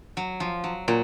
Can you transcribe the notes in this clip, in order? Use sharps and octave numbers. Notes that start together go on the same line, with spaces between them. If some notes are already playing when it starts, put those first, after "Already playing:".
F#3
F3
F#3
A#2 F#3